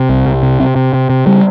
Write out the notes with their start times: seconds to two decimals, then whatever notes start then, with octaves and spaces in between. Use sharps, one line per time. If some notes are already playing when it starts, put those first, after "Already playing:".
Already playing: C3
0.09 C2
0.27 C2
0.43 C3
0.60 C3
0.76 C3
0.93 C3
1.10 C3
1.26 C#3 G3